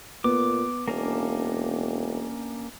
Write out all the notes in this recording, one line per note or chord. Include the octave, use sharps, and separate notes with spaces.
A#2 B3 D6
E1 A#3 C#4 D4